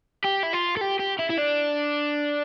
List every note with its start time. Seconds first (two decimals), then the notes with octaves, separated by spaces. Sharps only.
0.24 G4
0.43 E4
0.53 F4
0.77 A4
0.81 G4
1.00 G4
1.19 E4
1.30 E4
1.38 D4